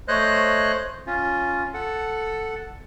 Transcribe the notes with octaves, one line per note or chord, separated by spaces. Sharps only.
A3 C5 C#5 D#5 F#6
C#4 F4
A4 F#5